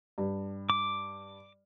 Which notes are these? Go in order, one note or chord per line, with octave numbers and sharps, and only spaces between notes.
G2
D6